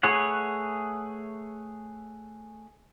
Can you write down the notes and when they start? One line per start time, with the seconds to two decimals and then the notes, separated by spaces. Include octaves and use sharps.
0.03 A3 G#4 B4 C#5 F#5